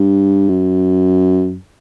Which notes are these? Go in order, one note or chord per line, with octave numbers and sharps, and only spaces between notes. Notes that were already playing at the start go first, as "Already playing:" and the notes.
Already playing: G2
F#2